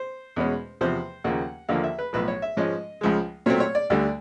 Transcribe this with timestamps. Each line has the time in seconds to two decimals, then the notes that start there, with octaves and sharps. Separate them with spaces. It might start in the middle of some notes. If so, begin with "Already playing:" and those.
Already playing: C5
0.36 E2 B2 G#3 C#4
0.81 E2 C3 F3 C5
1.24 D#2 C#3 F3 A#3 F#5
1.69 D#2 D3 F3 A#3 F5
1.84 E5
1.99 B4
2.13 B1 A2 F3 B4
2.28 C#5
2.42 E5
2.57 G#2 F3 G#3 C#4 D#5
3.01 C#2 C#3 F3 G#3
3.46 A#2 F#3 A3 C4 C#5
3.60 C#5
3.75 D5
3.90 D2 D3 G3 D5